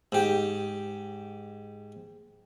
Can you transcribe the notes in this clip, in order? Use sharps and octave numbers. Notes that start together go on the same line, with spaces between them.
G#2 G4